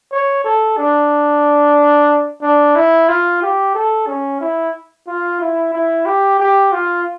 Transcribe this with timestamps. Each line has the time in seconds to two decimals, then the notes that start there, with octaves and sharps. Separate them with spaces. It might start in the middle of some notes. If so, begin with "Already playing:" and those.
0.12 C#5
0.44 A4
0.78 D4
2.42 D4
2.75 E4
3.09 F4
3.42 G4
3.75 A4
4.07 C#4
4.41 E4
5.07 F4
5.40 E4
5.73 E4
6.06 G4
6.39 G4
6.72 F4